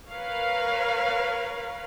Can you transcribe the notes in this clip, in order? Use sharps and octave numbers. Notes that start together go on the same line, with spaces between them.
A#4 B4 C#5 F5